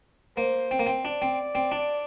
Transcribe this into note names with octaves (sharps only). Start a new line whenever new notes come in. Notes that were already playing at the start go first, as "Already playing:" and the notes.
A#3 C5
C4
A#3
C4
D4 D5
C4
C4
D4